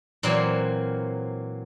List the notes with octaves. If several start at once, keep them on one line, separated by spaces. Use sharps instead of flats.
A#2 E3 F#3 A#3 C4